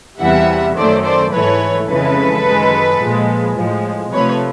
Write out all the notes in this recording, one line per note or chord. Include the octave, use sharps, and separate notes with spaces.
E2 C3 E3 G3 E5 F#5
F#2 D#3 F#3 A3 C5 D5
C5 D5
G#2 E3 A3 B4 C#5
F2 C#3 E3 G#3 A4 B4
F#2 D#3 G#3
A#2 F3 G#3
A2 F3 G#3
C3 F3 A3 B4 C#5